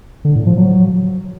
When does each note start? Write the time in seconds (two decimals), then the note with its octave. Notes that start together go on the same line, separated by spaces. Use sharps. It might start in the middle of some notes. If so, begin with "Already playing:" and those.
0.25 D3
0.36 A2
0.47 F3
0.58 F#3